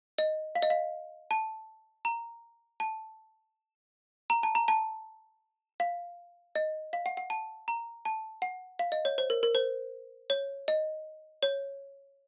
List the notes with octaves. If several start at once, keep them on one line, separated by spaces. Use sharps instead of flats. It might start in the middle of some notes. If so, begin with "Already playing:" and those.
D#5
F5
D#5
F5
A5
A#5
A5
A#5
A5
A#5
A5
F5
D#5
F5
F#5
F#5
A5
A#5
A5
F#5
F5
D#5
C#5
C5
A#4
A#4
C5
C#5
D#5
C#5